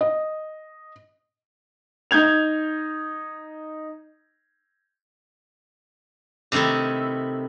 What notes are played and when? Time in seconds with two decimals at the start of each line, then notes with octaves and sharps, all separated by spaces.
0.01 D#5
2.11 D#4 G6 G#6 F7
6.52 C3 D#3 A3 D#4 E4